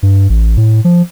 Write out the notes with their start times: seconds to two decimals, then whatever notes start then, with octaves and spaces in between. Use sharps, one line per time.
0.03 G2
0.30 A1
0.57 A2
0.84 F3